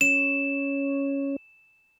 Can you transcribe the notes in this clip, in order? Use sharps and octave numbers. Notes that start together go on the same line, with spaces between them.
C#4 E7